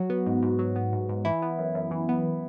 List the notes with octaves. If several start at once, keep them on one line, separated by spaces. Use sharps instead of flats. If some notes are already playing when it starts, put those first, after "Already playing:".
Already playing: F#3 F#4
B3
G#2
G#2
F#3
B3
G#2
G#2
E3 E4
B3
F#2
F#2
E3
B3